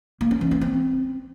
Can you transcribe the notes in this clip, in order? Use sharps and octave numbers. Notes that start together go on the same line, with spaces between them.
A#3
C#4
E3
B3
C4